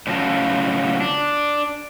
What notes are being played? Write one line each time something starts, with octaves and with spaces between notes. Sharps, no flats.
A2 C#3 F#3 F4 A5
D4